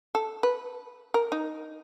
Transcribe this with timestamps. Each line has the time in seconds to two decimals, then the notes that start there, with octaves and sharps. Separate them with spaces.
0.15 A4
0.43 B4
1.14 A#4
1.32 D#4